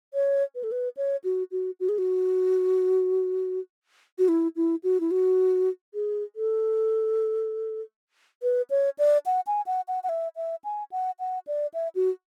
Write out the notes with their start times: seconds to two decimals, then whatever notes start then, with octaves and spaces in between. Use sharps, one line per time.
0.14 C#5
0.55 B4
0.64 A4
0.72 B4
0.97 C#5
1.24 F#4
1.52 F#4
1.80 F#4
1.89 G#4
1.98 F#4
4.19 F#4
4.28 E4
4.56 E4
4.84 F#4
5.00 E4
5.11 F#4
5.94 G#4
6.36 A4
8.43 B4
8.70 C#5
8.99 D5
9.26 F#5
9.47 G#5
9.67 F#5
9.88 F#5
10.03 F#5
10.09 E5
10.36 E5
10.64 G#5
10.92 F#5
11.20 F#5
11.47 D5
11.74 E5
11.95 F#4